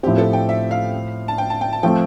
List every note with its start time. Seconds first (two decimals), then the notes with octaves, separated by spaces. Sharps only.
0.03 A2 F3 C4 G4
0.18 A4
0.33 G5
0.49 E5
0.71 F5
1.28 A5
1.38 G5
1.50 A5
1.61 G5
1.73 A5
1.83 F3 A3 C4 G5